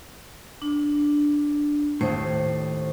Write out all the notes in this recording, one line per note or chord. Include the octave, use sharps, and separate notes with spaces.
D4
D#2 A2 C5